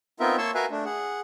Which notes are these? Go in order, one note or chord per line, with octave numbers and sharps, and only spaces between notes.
B3 C4 D#4 F4 A#4 E5
A#3 C#5 A5 C6 C#6 E6
F#4 A#4 B4 E5 F5 G#5
A3 D4
G#4 F#5